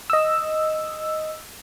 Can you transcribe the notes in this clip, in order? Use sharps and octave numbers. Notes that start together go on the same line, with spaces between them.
D#5 E6